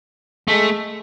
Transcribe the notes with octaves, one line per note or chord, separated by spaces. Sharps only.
G#3 A3